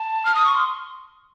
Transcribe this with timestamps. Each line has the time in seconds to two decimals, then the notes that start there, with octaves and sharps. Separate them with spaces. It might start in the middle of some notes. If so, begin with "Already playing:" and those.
Already playing: A5
0.25 F6
0.35 D#6
0.45 C#6
0.54 C6